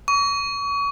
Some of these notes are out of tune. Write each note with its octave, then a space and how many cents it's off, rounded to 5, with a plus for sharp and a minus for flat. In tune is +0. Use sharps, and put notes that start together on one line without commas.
C#6 +35